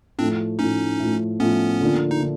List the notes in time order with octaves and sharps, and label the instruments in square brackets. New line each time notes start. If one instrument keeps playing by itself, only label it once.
[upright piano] A2 F3 A3 [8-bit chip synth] C4 D4
[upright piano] A2 F3 A3 [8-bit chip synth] C#4 D#4
[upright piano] A2 F3 A3
[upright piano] A2 F3 A3 [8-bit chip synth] B3 C#4
[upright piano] D3 F3 A#3 D4 F4
[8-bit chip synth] D#4
[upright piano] D3